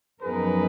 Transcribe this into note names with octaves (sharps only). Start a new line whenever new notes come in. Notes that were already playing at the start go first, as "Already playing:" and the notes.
F#2 F3 B3 D#4 G#4 A#4 B4